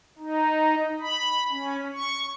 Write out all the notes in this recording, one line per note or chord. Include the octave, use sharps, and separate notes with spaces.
D#4
B5
C#4
C#6